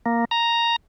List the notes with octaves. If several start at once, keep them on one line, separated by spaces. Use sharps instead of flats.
A#3
A#5